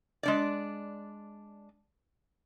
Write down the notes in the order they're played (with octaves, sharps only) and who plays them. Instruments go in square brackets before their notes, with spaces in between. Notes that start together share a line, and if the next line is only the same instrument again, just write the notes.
[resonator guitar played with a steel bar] G#3 D4 D5